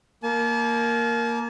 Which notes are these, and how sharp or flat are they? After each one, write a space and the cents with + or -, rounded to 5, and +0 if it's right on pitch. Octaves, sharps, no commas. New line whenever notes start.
A#3 +0 A5 -40